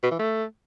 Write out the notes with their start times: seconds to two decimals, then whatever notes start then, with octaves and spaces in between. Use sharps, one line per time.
0.03 B2
0.11 E3
0.19 A3